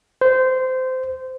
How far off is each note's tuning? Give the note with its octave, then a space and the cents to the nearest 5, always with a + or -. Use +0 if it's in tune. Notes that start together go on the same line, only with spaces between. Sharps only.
C5 -20